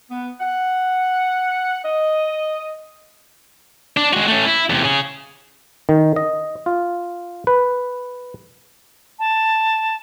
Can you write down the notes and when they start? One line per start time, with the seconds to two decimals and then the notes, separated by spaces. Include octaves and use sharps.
0.11 B3
0.40 F#5
1.85 D#5
3.97 D4
4.13 G#3 F#4
4.28 A3 C#4
4.45 E4
4.70 E2 C3
4.84 C#4 G#4
5.89 D#3
6.16 D#5
6.66 F4
7.47 B4
9.19 A5